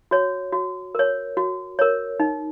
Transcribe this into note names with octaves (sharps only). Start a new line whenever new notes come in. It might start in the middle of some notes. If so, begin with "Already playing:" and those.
F#4 C#5
F#4
A#4 C#5
F#4
A#4 C#5
D#4